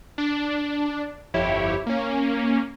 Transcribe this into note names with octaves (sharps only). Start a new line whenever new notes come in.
D4
G1 F2 E4 G4 C#5
A#3 C#4